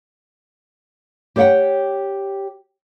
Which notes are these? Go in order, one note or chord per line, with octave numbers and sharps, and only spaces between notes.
G4 C5 C#5 E5 F#5 G5